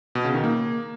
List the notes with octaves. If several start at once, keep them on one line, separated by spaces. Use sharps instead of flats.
B2
C#3
D#3
A#3